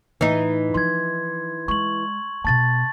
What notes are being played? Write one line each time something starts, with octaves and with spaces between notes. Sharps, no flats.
A2 E3 D#4
F3 E4 C6 G#6
G#3 C#6 F#7
B2 B3 A5 A6